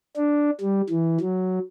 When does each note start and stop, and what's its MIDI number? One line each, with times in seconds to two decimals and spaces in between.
0.16 0.50 62
0.61 0.81 55
0.89 1.18 52
1.21 1.59 54